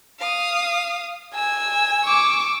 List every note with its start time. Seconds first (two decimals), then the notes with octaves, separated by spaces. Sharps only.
0.19 F5 D#6
1.35 G#5 E6
2.04 C#6 D6